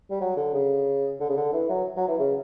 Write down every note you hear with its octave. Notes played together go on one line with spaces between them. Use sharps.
G3
F#3
D3
C#3
D3
C#3
D3
E3
F#3
F#3
E3
C#3